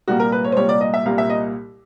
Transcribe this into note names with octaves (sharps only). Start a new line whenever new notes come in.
C2 A#2 G3 A#3 F#4
A#4
B4
C#5
C5
C2 A#2 G3 A#3 C#5
D5
D#5
E5
C2 A#2 G3 A#3 F5
E5
D#5